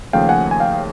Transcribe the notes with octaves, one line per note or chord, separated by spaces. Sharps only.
D#2 C#3 F3 A3 F5 G5
F#5 G#5
G#5
F5 G5